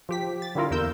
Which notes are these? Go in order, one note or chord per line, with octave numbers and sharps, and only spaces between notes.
F3 G4 B6
A6
D3 G3 A#3 E4 F4 A#4
E2 A#3 A#4 E6 G6